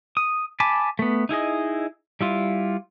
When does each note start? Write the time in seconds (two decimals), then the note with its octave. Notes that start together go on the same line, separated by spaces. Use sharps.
0.17 D#6
0.60 G#5 A5 B5 D6
0.99 A3 B3
1.29 D#4 E4 G#4 D#5
2.21 G3 E4 F4